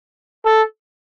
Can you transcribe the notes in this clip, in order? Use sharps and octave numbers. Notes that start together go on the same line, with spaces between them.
A4